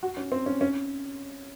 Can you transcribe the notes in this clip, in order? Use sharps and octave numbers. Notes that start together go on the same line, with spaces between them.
F#4
C#4
C4
C#4
C#4